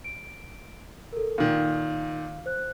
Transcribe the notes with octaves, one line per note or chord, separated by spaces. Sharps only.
D7
A4 A#4
A#2 D#3 F5
C5 F#6